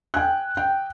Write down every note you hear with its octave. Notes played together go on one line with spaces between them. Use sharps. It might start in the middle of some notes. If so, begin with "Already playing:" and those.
G5 G#5 F#6
G5